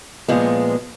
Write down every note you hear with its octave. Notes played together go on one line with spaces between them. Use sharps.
A#2 F3 G#3 B3